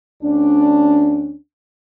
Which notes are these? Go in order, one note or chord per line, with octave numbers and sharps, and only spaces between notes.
D2 C#4 D4